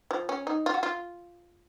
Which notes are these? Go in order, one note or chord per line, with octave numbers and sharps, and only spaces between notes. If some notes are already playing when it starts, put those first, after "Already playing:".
F3
C#4
D#4
F4
F#4
F4